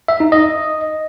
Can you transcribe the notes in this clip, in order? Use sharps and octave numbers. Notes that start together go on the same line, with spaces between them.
E5
D#4
D#5